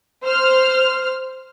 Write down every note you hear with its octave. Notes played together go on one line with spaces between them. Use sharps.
C5 F6